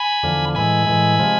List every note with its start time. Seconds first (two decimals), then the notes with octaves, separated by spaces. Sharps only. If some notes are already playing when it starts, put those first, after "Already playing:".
Already playing: G#5 B5
0.23 E2 D3 F3
0.55 A2 E3 G#3 G#5 B5
0.87 A2 E3 G#3
1.19 C3 F3 G#3